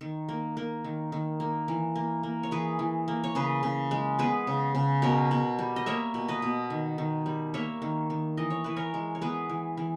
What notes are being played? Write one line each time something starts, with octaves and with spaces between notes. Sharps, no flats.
D#3
A#3
A#3
D#3
D#3
A#3
E3
A#3
A#3
C#5
E3 G#4 B4
E3
A#3
C#5
C#3 G#4 B4
C#3
G#3
B3 G#4 B4
C#3
C#3
B2 A#4 C#5
B2
G3
D#5
A#3 C#5 E5
B2
B4 D#5
B2
D#3
D#3
G3
A#3 C#5 E5
D#3
D#3
E3 D#5
C#5
E3 B4
A#4 C#5
G#3
C#5
B3 G#4 B4
E3
E3